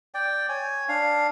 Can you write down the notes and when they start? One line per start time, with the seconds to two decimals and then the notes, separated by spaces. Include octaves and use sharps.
0.14 D5 G5
0.49 C#5 G#5
0.89 D4 F5